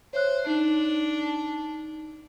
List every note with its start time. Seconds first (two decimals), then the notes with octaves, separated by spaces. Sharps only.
0.13 C5 C#5 E5 F#6
0.47 D4 D#4